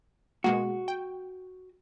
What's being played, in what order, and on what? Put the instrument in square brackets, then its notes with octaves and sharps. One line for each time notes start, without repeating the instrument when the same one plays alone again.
[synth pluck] B2 G#3 A#3 [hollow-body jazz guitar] F#4
[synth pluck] G5